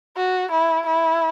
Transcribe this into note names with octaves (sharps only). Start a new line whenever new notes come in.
F#4
E4
E4